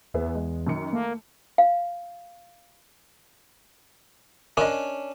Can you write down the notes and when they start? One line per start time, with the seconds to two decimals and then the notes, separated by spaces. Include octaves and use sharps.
0.14 E2 B3 G#4 E5
0.35 G#3
0.67 F#2 D#3 C#7
0.93 A3 A#3
1.58 F5
4.57 C#4 D4 A#4 C#5 D#5